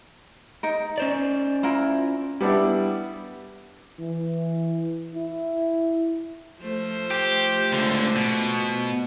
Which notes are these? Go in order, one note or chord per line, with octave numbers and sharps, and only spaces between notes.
D#4 A#4
C#4 C5 D5
E4 F4 A#4
G3 B3 D4 E4
E3
E4
F3 A3 C5
G4
C#2 D3
B2